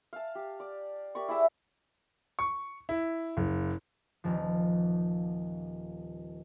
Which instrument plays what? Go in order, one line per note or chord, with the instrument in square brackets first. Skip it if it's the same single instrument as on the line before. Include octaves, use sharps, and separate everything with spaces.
[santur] F5 A5
G4
D5
G4 A#4 D5 C#6
E4 G#4 D5 E5
[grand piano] C#6
E4
F#1
[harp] D#1 F3